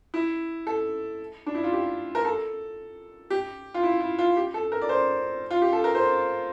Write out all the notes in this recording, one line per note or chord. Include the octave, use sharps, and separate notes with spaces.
E4
A4
D4
E4
F4
G4
A#4
A4
G4
F4
E4
E4
F4
G4
A4
A#4
D5
C5
F4
G4
A4
A#4
C5